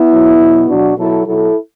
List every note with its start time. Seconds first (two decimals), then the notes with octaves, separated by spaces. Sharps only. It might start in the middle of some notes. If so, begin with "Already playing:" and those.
Already playing: B3 E4
0.11 B2 F#3
0.39 B2 F#3
0.68 B2 F#3 D4 F#4
0.97 B2 F#3 E4 A4
1.26 B2 F#3 E4 A4